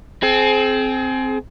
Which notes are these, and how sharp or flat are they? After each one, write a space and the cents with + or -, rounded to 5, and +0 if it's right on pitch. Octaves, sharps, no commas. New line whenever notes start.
C4 +0 G#4 +35